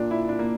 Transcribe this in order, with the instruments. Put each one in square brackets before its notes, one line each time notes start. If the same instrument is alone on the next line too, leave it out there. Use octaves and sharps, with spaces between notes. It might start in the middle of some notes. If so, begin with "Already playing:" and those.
Already playing: [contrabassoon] A#2 [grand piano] D4
[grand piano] E4
D4
A#3